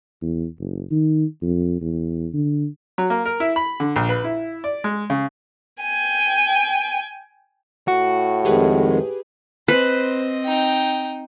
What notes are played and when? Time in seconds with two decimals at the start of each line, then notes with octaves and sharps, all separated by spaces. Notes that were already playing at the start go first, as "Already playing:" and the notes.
0.22 E2
0.59 F#1
0.91 D#3
1.42 F2
1.81 E2
2.34 D3
2.98 F#3
3.10 A#3
3.25 A#4
3.40 E4
3.56 B5
3.80 D3
3.96 A#1
4.09 B4
4.24 E4
4.64 D5
4.84 G#3
5.10 C#3
5.81 G5 G#5
7.88 A2 F#4
8.45 F2 D#3 G#3 G4 G#4 B4
9.68 C4 B4 C5 D#5
10.45 D#4 G5